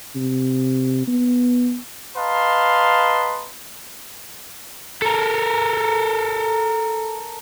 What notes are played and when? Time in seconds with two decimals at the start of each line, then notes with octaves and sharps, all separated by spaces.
0.15 C3
1.07 B3
2.16 B4 D#5 F5 A5 A#5 C6
5.02 A4 A#4